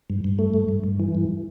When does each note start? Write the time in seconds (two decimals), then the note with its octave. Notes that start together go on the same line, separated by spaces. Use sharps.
0.10 G2
0.24 G2
0.39 A3
0.54 G2
0.69 G2
0.84 G2
1.00 E3
1.15 G2